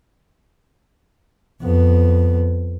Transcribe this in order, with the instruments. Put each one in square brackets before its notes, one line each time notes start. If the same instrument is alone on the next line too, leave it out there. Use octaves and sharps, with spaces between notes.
[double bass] F2 B3